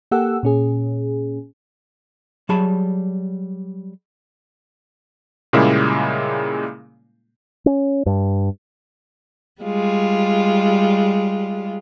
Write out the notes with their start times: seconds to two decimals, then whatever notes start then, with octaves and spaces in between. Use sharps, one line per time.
0.11 A#3 G4 A4 F#5 E6
0.43 A#2 C#4 G#4
2.49 F#3 G3 G#4 A5 B5
5.53 A#2 C#3 G3 G#3 A#3 E4
7.66 C#4
8.06 G2
9.61 G3 G#3 F4